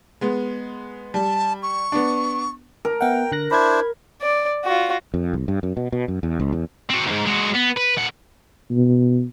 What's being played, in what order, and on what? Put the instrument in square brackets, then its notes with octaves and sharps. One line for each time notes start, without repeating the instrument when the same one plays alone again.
[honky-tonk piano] G#3 B3
[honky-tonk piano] G3 [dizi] A5
[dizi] C#6
[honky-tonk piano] B3 D4
[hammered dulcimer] A#4
[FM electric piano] B3 E5 F#5 [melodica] G5
[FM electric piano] D3 F#6 A#6
[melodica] D4 E4 C5 [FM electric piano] B5 G#6
[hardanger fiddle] D5
F4 F#4
[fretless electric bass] F2
C2
G2
F#2
B2
B2
F#2
E2
C#2
E2
[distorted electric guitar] C4 F#4
D2 G#2
G#3 F#4
B3
B4
A#2 F#5
[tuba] B2